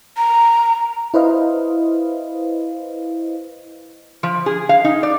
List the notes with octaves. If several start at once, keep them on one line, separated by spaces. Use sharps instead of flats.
A#5
E4 B4 C5 D#5 F5
F3
G#4
F5
D#4
D5